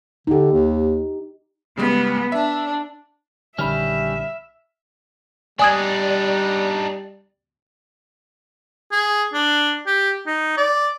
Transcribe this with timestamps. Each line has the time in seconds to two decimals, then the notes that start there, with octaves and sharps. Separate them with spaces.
0.27 D3 D#4 G4
0.52 D#2
1.77 C#3 G3 G#3 B3
2.32 D4 E5
3.59 A#1 D3 D#3 G3 C#4 E5 B5 F6
5.59 G3 D4 D#4 D5 G#5 D#6 G#6
8.92 G#4
9.33 D4
9.86 G4
10.26 D#4
10.57 D5